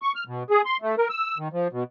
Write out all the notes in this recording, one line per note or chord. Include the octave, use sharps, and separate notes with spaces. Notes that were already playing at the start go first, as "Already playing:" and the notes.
C#6
F6
B2
G#4
C6
A3
A#4
E6
D#3
F3
B2